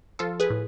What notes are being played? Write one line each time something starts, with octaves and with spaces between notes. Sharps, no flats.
F3 F4 A4
G#4 B4
A2